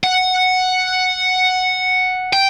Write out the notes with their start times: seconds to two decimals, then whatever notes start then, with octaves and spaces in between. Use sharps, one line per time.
0.04 F#5
2.33 G5